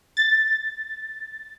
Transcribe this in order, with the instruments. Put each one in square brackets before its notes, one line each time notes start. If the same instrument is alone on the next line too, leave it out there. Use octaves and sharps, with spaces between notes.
[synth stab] A6